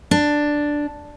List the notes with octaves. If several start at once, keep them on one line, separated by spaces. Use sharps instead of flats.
D4